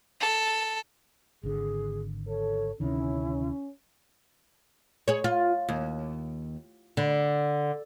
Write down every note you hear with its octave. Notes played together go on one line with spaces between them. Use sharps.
A4
G#1 D3 G#4
A4 C#5
D2 C3 D#3 C#4 E4
G#4 C#5
F4
D#2
D3